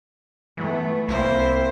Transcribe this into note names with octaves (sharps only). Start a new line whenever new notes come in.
E3 A3 B3
C2 A#3 C4 E4 C5